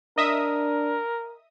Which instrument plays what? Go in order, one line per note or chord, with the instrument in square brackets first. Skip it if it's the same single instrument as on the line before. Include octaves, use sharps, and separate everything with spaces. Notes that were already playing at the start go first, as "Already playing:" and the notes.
[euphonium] D4 [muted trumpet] A#4 [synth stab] D#5 E5 D#6